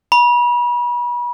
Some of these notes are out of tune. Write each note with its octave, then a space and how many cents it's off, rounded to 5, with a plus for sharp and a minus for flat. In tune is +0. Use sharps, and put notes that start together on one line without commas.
B5 -35